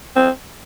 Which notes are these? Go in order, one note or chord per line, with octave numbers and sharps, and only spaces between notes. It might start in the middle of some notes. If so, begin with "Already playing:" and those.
C4